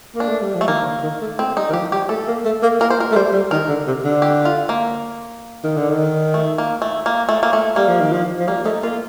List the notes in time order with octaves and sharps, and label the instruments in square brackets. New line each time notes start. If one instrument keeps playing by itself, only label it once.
[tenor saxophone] A#3
[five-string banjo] D4
[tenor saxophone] A3
G3
F3
[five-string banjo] A3
[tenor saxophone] D#3 [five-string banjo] A#3
[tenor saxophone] D3
D#3
A3
[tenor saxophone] A3 [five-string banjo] C4
[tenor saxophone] G3 [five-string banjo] D#4
[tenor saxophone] D#3
[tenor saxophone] F3 [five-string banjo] G4
[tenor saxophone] G3 [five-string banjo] G4
[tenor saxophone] A3 [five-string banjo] A4
[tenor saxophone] A#3
A3
A#3
[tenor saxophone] A#3 [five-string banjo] A#4
[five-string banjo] C5
A#4
[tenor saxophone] A3
[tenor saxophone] G3 [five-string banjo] C5
[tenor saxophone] G3
[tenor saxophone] D#3 [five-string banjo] A#4
[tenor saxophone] D3
C3
D3
[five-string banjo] G4
F4
A#3
[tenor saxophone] D#3
D3
D#3
[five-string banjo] A3
A#3
A3
A#3
A3
A#3
A3
[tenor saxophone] G3 [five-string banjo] A#3
[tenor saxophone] F3
D#3
F3
F3
[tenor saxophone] G3 [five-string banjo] A#3
[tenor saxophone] A3 [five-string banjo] D#4
[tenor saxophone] A#3 [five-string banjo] F4